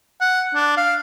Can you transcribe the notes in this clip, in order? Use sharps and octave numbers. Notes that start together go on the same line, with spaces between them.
F#5
D4
F5